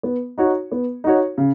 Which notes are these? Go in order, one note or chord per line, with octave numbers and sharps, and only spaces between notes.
B3
D#4 F#4 C#5
B3
D#4 F#4 C#5
C#3